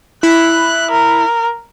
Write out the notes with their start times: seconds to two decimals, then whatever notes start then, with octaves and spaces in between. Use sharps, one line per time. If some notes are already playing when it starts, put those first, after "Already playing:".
0.23 E4 B5 F#6
0.91 A#4